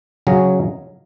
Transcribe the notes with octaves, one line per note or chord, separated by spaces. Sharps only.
C#3 F#3 C#4 G#4